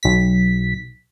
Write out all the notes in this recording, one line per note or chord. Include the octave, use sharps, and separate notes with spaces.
B1 B6